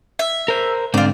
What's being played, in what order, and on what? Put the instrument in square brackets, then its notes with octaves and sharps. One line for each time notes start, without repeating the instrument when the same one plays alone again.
[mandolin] E5
[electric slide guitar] A#4 C5
[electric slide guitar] G#2 D3 C4 [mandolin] F4 D5